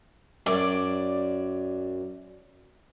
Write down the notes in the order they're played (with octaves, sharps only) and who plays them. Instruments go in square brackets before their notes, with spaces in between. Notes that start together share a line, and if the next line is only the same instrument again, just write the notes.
[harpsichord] F#2 [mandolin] D5